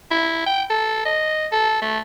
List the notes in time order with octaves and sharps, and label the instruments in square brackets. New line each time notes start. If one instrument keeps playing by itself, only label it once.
[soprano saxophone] E4
G5
A4
D#5
A4
A3